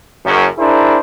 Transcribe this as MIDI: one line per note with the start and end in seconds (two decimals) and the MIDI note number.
0.24 0.46 30
0.24 0.46 42
0.58 0.99 62
0.58 0.99 64
0.58 0.99 68
0.58 0.99 70
0.58 0.99 72